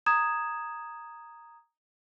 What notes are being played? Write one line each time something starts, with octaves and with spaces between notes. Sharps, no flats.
A#5 D#6 G#6 E7